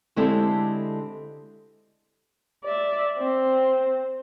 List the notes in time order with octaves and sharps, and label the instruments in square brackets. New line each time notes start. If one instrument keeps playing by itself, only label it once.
[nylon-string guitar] D3 G#3 C4 E4 G4 A4
[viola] D5 E5
C4